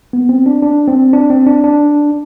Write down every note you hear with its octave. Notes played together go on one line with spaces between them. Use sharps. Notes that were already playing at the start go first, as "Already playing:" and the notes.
B3
C4
D4
D4
C4
D4
C4
D4
D4